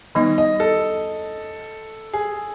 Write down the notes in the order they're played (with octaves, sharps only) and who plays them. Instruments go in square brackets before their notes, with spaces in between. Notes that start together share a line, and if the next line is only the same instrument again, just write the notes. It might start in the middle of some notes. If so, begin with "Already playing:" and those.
[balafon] D#3 G3 B3 D#4 [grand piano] D#5
[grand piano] D#5
A4
G#4